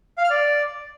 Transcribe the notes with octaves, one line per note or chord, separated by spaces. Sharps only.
F5
F6
D5